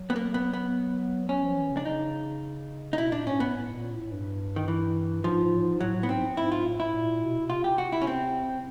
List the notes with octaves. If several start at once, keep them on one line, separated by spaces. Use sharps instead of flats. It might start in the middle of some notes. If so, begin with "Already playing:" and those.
Already playing: F#3
B3
A#3
B3
B3
F#3 C#4
F3
E3
C#3
D4
C#3 D#4
D#4
B2 E4
A#2 D4
G#2 C#4
G#2 B3
A2
A#2
A2
G2
D#3
E3
G#2 F3
G#2
A2
G#2
A2 F#3
A2
B3
G#2 C4
G#2 E4
F4
A2
E4
A#2
B2
B2
C3 F4
G4
F#4
E4
C#4
C4